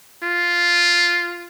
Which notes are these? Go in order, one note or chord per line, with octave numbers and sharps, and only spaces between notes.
F4